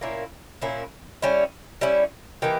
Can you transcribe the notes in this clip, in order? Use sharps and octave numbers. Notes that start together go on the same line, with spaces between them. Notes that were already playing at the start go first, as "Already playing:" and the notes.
A#2 A#3 C#4 E4
A#2 A#3 C#4 E4
G3 C#4 E4
G3 C#4 E4
E3 A#3 D#4 G4